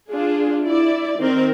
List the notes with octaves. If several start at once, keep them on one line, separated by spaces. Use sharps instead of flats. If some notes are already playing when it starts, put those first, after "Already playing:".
D4 F4 G#4
E4 D5
D#3 C4 A#4